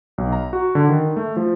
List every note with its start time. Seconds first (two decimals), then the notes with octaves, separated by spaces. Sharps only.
0.18 B1
0.32 A#5
0.53 F#4
0.75 D3
0.89 D#3
1.17 A3
1.37 F3